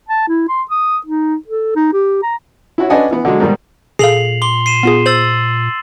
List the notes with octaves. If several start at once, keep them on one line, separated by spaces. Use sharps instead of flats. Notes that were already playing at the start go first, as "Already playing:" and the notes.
A5
E4
C6
D#6
D#4
A4
D#4
G4
A#5
E4 F#4 C#5
C#4 D4 B4 D#5 F#5 G#5
E3 B3
D3 F#3 G#3
G#2 B2 D#3 G3
A#2 G#4 A4 F5 C7 F7 F#7
C6 D6 G7
C7 D#7 E7
B3 F4 G#4
C5 E6 A6 F#7